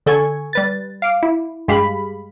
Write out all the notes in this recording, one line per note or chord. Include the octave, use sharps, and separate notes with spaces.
D3 A4 G#5 C#6
G3 B4 A6
F5 D6
E4
G2 G#3 G4 F5 B5